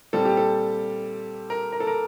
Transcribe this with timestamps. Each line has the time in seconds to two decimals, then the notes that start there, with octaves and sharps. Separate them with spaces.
0.13 A#2 G3 C4 A4
0.25 G4
0.37 A4
1.50 A#4
1.72 A#4
1.80 A4
1.87 A#4